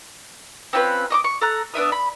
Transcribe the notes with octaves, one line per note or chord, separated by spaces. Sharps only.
C4 C#4 F4 B4
D#5 C#6 D6
C#6
A4 A#5 F#6
B3 D4 E5 D#6
B5